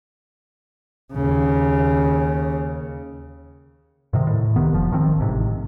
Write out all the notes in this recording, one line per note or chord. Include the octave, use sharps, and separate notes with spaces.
D#2 C#3
G#2 C3 D#3
A2
C2 C3 D#3 B3
F1 F3
G#1 D#3 F3 C4
A1 G#2 C3